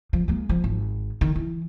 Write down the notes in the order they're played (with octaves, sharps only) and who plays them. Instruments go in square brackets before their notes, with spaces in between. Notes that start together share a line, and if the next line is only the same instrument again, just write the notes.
[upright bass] F3
G#3 A#3
F3
G#1
D#3
E3